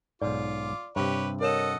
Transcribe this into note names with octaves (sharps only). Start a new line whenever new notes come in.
B1 G#2 F4 D5 D6
G2 C3 G4 B4 C#5
A4 A#4 C#5 D#5 F#5 E7